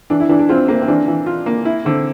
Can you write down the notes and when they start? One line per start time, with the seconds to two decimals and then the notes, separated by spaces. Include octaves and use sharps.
0.10 E3 D4
0.20 E4
0.29 E3 D4
0.39 D4
0.49 C4 F4
0.68 A#3 C4
0.81 C4
0.88 E3 D4
1.08 E3
1.27 F4
1.46 A#3
1.65 E4
1.85 D3 C4